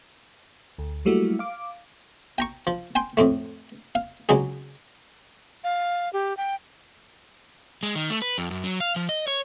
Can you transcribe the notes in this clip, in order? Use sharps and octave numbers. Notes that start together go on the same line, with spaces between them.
D2
F#3 G3 A3 A#3 E4 F#4
F5 D6
G5 A#5 C#6
F3
G5 G#5 C6
F2 A2 A3
F5
C#2 F#3 D#4 G#4
F5
G4
G5
G#3
D#3
A3
B4
F2
F#2
F#3
F5
F3
D#5
C#5